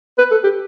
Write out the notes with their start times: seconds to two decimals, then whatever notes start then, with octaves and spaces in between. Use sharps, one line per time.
0.18 B4
0.31 A4
0.44 G4